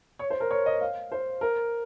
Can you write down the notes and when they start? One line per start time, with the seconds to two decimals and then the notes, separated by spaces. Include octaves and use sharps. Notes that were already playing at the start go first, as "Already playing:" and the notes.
0.19 C#5
0.30 C5
0.40 A#4
0.51 C#5
0.66 D#5
0.81 F5
1.12 C5
1.41 A#4